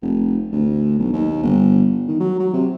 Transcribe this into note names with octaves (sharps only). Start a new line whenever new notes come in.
F1
D2
B1
D#2
G1
D#3
F#3
F#3
C3